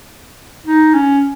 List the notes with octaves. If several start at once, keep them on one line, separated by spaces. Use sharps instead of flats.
D#4
C#4